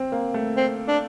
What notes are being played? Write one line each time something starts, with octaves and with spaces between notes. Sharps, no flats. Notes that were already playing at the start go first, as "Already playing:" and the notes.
Already playing: C4
A#3
A3
C4
D4